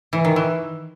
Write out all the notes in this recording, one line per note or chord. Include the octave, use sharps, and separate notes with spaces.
E3
D#3
E3